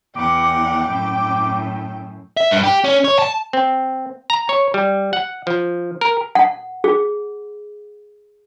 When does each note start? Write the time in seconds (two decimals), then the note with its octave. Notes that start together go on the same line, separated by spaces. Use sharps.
0.16 E2 F#5 G5 D6
0.90 F#2 A2
2.37 E5
2.51 G2
2.64 G4
2.84 C#4
3.04 C#5
3.19 A5
3.53 C4
4.30 A#5
4.49 C#5
4.74 G3
5.13 F#5
5.47 F3
6.01 A#4
6.35 F#5
6.84 G#4